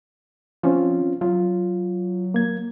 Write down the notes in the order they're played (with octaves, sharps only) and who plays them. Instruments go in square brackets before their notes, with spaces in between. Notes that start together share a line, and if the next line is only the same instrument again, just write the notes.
[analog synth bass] F3 [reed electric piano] C4 C#4 F4
[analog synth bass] F#3 [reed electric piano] F4
[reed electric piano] A#3 G#6